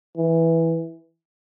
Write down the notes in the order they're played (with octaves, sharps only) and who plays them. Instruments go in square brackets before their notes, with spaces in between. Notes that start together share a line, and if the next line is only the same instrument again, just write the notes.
[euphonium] E3